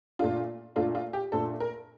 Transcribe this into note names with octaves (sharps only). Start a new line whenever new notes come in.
A#2 A3 D4 F4
A#2 A3 D4 F4
F4
G4
A#2 A3 D4 A4
A#4